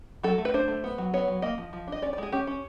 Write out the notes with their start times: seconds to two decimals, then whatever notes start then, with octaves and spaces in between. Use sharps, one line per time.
0.23 F#3 A4
0.38 A3
0.45 B4
0.54 D4 C5
0.68 A3
0.84 B3
0.98 F#3
1.14 B3 C#5
1.28 F#3
1.42 A#3 D#5
1.58 F3
1.73 F3
1.87 D4 D#5
2.02 C#4 D5
2.13 D5
2.18 G#3 G#4
2.32 C#4 G4
2.47 C#4